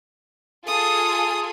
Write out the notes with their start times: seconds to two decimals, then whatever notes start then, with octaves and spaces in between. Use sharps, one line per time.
0.67 F4 G#4 A4 D#6